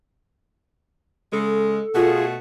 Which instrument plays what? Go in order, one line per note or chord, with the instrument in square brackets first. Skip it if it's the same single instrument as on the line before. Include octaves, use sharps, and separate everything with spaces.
[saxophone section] C#3 G#3 [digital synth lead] A4
[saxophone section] B2 A3 F#4 [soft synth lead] F4 [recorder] G#4